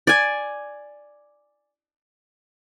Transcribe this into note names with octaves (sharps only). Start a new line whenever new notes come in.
D5 G#5